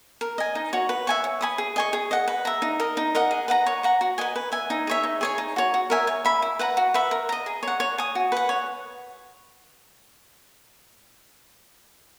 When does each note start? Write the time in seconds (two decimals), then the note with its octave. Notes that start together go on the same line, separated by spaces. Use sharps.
0.21 A#4
0.38 D#5 G#5
0.55 D#4
0.73 F#4 C#5
0.89 B4
1.07 E5 G#5 C#6
1.24 C#5
1.41 G#5 B5 D#6
1.58 G#4
1.76 D#5 G#5 C#6
1.93 G#4
2.11 D#5 F#5
2.28 B4
2.45 E5 A#5
2.62 D#4
2.80 A#4 D#5
2.97 D#4
3.15 A#4 D#5 F#5
3.31 G#4
3.48 B4 F#5 A#5
3.66 C#5
3.83 F#5 A#5 C#6
4.01 F#4
4.18 B4 D#5 G#5
4.36 B4
4.52 E5 G#5
4.70 D#4
4.87 G#4 C#5 E5
5.03 D#4
5.21 G#4 C#5 G#5
5.38 D#4
5.56 F#4 C#5
5.74 F#4
5.90 A#4 E5 G#5
6.07 C#5
6.25 E5 B5
6.42 E4
6.59 B4 F#5 A#5
6.77 F#4
6.94 B4 E5 B5
7.11 A#4
7.29 D#5 A#5
7.46 G#4
7.63 C#5 F#5
7.80 C#5
7.98 G#5 D#6
8.15 F#4
8.32 B4 F#5
8.49 C#5